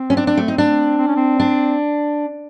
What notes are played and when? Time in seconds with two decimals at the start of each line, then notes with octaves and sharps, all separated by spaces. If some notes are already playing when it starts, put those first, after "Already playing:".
Already playing: C4
0.10 C#4
0.17 D4
0.27 D4
0.37 A3
0.48 D#4
0.58 D4
0.98 C4
1.08 C#4
1.16 C4
1.40 D4